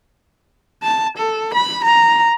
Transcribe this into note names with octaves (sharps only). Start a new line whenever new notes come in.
A5
A4
B5
A#5